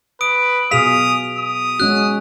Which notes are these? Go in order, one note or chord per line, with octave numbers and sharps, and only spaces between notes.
B4 D#6 D7
B2 G#4 F5 D#6 B6 F7
D#6
G#3 C#4 F#4 F#6